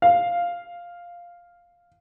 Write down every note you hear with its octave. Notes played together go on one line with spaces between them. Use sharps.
F5